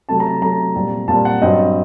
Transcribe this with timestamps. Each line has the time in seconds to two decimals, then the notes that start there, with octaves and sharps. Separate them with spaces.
0.09 C3 F#3 A3 A5
0.20 A#5
0.42 C3 F#3 A3 A#5
0.75 A#2 G3 C4
1.08 A#2 G3 C4 A5
1.25 F#5
1.41 G2 F#3 C4 D#5